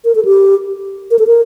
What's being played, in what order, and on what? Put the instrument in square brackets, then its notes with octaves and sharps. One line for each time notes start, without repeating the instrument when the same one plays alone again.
[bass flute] A#4
A4
G4
A#4
A4
A#4